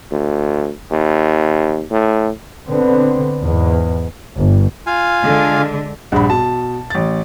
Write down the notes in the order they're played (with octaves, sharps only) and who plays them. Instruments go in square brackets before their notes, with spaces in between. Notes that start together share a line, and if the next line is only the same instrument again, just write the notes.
[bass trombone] D2
D#2
A2
[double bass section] D3 B3 C4
E2 G#2
[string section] G1
[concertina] F4 F5 G#5
[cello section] D3 G#3
[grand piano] A#1 G2 [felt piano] F#5 B5
[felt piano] B2 [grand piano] A5
[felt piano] A1 A6